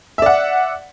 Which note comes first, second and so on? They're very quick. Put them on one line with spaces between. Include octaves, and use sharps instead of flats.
E5 D5 F#5